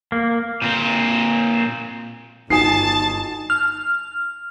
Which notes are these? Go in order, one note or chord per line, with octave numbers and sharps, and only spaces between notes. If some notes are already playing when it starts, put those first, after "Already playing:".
A#3
A#2 C4
G1 D#4 F#4 G#5 A5 D#6 C7
F6